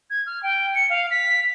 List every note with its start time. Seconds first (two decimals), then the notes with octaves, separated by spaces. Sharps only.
0.10 G#6
0.26 F6
0.43 G5
0.75 C#7
0.90 F5
1.11 B6